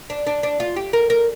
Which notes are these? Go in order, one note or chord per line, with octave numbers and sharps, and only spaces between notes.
D4
D4
D4
F4
G4
A#4
A#4